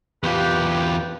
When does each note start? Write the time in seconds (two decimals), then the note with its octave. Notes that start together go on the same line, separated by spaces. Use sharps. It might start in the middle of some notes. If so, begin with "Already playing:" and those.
0.23 E2 F4 G4 B4